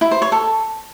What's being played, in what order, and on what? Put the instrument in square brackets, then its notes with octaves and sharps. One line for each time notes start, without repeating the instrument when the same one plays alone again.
[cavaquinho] E4
C5
C#5
A4